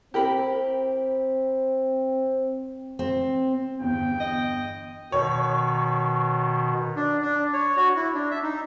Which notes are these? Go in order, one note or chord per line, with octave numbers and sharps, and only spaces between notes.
C4 G4 A#4 B5
C4
G1 E2 G5
D#5
B2 D#3 C#5
D4
D4
C#5
F#4
E4
D4
E5
D#4